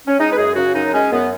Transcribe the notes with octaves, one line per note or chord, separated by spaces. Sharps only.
C#4
G#3 D#4
B4
F#2 G#4
C#3 F#4
F#2 D#4
G#3 C#4
F#2 B3